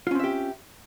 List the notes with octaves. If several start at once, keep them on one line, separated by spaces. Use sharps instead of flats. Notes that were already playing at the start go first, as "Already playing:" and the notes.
C4 C#4 F4 G4 E5